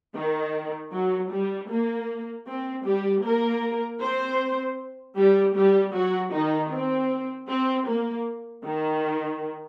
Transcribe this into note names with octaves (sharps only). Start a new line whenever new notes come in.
D#3
F#3
G3
A#3
C4
G3 G4
A#3 A#4
C4 C5
G3 G4
G3 G4
F#3 F#4
D#3 D#4
C4
C4
A#3
D#3